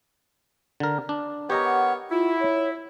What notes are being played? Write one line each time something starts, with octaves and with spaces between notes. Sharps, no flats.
D3 A#4
D4
B3 G4 A#4 C#5 D#5 A#5
F#5
E4 F4
C#5